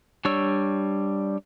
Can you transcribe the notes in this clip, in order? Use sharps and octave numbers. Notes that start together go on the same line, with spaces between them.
G3 D4 C#5 C#6 E6